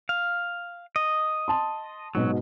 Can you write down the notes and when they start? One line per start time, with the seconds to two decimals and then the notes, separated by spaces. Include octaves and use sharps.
0.09 F5
0.96 D#5
1.48 A5 C6
2.15 G#2 B2 F#3 B3